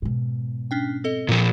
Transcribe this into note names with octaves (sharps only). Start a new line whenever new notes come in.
G#2 B2
C#4 D4 G5
C4 A4 D#5
A#2 F3